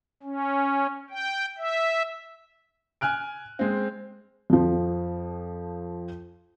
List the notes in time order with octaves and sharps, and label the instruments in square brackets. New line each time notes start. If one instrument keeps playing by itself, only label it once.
[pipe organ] C#4
G5
E5
[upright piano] G#5 F6 F#6 D7
G#3 C4
[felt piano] F2 F3